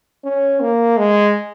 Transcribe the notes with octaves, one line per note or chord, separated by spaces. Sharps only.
C#4
A#3
G#3